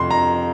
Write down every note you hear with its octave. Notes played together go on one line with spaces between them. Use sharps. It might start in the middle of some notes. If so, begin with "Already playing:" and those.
Already playing: F2 C3 C6
A#5